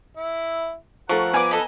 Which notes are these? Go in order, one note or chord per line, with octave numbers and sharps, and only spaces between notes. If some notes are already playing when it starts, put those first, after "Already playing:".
E4
F3 A3 A4 A#4 F#5 C#6
B3 B4 D5 G#5 A#5 D6
A4 B4 D#5